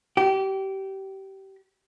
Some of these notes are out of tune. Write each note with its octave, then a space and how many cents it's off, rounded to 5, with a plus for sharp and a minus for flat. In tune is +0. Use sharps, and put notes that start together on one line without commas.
G4 -25